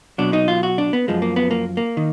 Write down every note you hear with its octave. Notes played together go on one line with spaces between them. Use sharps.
B2 F#3 D4
D#4
F4
F#4
D4
B3
F#2 F3 G#3
A#3
B3
A#3
A#3
D#3